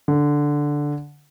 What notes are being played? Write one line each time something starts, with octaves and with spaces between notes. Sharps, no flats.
D3